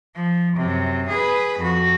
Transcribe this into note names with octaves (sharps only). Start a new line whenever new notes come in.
F3
F#2 C3
G#4 B4
F2 F#4